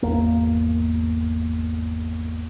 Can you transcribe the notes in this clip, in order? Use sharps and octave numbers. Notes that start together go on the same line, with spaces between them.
G#1 E2 A#3